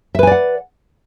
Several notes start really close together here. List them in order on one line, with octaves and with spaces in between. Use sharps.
E5 B4 G#5 D5 F#5